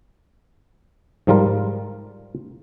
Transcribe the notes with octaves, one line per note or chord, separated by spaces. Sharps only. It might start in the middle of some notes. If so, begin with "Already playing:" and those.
G#2 F3 G3 F4 A#4